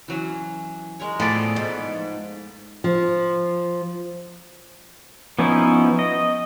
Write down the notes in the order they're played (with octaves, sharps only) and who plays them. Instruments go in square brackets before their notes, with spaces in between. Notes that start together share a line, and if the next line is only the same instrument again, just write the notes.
[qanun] E3 F#3 C#4
G#3 A#4 C#5
[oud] A2 [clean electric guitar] F3 B3 D5 [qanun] G#4 A4
[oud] G#2
[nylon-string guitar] F3
[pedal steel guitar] F3 B3 C#4 D#4 E4
D#5